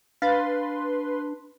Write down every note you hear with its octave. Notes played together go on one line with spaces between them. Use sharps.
D4 B4 F5 B5 C6 A6